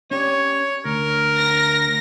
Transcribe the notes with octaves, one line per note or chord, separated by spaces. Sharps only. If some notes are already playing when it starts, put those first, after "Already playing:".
C#4 G4 C#5 D5
D2 A#4
A#6